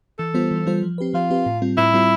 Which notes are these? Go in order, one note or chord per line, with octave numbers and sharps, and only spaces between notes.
E3 A4
G3 B3 F4 C5
E3
G3 B3 F4 C5
F3
C4 G4 B4
F3 F4
C4 G4 B4
A2
G3 C4 F4
A2 E4
G3 C4 F4